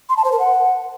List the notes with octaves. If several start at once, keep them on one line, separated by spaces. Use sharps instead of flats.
C6
A5
C5
A#4
F#5